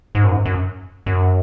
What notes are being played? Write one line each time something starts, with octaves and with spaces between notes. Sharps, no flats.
G#2
F#2
G#2
F#2
F#2